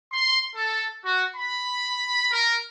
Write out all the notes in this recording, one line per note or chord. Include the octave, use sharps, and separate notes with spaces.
C6
A4
F#4
B5
A#4